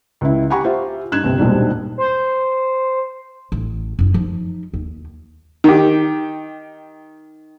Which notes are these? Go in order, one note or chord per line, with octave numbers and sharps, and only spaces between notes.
C#2 E4
G4 F#5 G#5 A#5 B5 C#6
F4 G4 C5 E5
G2 D#4 F#6 G#6 E7
G1 C2 C4
D#1 B1 G#2 G3 D4
C5
A1
F#2 E4
F3 D#4
D#2
D#3 G4